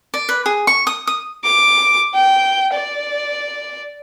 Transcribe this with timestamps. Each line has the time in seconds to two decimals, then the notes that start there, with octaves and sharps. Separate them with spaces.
0.14 D5
0.29 B4
0.46 G#4
0.67 C#6
0.87 D#6
1.07 D#6
1.44 D6
2.14 G5
2.73 D5